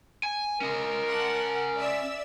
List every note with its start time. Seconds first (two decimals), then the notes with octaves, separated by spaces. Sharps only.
0.23 G#5
0.61 C#4 A#4 D#5
1.08 F#5 A5
1.76 D5 E5 E6